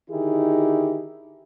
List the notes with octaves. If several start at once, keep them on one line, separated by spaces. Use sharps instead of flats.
D3 D#3 D#4 E4 G4 G#4